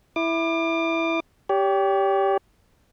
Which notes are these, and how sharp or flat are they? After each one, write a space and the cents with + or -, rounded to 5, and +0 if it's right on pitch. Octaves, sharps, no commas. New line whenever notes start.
E4 +0 D6 +30
G4 +0 C#5 +40